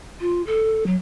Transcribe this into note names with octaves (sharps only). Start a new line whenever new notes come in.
F4
A4
F#3